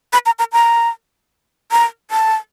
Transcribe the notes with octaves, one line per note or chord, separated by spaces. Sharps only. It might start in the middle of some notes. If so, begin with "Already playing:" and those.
B5
A#5
A#5
A#5
A#5
A5